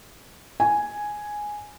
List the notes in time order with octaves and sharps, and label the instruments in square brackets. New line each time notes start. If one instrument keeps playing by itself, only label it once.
[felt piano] G#5